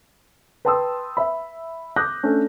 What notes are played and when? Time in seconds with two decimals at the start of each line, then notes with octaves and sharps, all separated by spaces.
0.65 B4 G5 A5 C6 D#6 E6
1.17 E5 B5
1.96 D6 D#6 F#6 G6 A#6
2.23 A3 C#4 D4